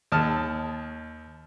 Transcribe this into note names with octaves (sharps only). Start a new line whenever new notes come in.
D#2 A5 D#6 F6